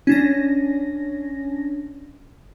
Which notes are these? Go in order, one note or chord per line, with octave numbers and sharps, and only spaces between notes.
C#4 D4 A#6